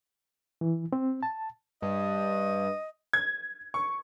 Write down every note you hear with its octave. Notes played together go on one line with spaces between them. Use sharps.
E3
C4
A5
G2 D#5
G#6
C#6